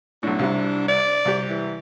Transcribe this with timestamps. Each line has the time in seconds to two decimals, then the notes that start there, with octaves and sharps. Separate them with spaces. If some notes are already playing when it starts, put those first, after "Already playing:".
0.23 B1 A2 D4
0.39 C2 C3 E4
0.88 D5
1.25 C2 G4
1.50 E3